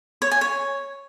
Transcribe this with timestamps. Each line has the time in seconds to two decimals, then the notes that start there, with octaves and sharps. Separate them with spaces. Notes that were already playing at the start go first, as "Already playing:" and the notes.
0.22 C#5
0.31 G#5
0.41 C#5